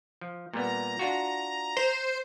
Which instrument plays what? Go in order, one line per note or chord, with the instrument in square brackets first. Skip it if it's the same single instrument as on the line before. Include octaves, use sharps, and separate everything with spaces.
[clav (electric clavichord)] F3
[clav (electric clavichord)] A#2 G3 B3 [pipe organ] A#5
[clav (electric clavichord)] D4 F4 F#4
[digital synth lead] C5